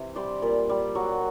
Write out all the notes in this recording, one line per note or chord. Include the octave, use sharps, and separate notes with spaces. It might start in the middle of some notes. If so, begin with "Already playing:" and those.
Already playing: C3 E3
G3 C5 D5
A#2
G3
F#3